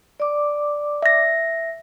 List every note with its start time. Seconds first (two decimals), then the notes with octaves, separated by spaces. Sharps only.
0.20 D5 D6
1.02 E5 A#6